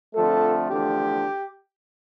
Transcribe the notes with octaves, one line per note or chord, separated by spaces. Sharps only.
F2 D3 F3 A3 A4
E2 D3 F3 A3 G4